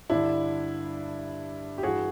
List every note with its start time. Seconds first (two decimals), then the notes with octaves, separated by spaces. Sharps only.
0.10 G2 D3 D4 E4
1.78 G4
1.83 G2 E3 F#4 G#4